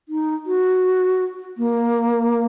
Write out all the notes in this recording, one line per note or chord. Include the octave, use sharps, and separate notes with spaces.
D#4
F#4
A#3